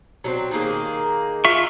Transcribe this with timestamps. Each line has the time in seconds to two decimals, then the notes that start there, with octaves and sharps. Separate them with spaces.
0.24 F#3 A3 C4
0.51 D#3 A#3 G#4
1.45 F4 E5 C#6